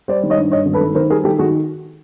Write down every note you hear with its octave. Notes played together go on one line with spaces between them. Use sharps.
G3 C5 D5
D#3
C#5 D#5
G2
G2 C#5 D#5
G#1
A4 B4
D#3
D#3 A#4 C5
G3 G#4 A#4
D#3 G4 A4
D#3 F#4 G#4